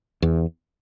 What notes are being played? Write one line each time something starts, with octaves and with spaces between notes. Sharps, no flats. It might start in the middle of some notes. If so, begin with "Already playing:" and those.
E2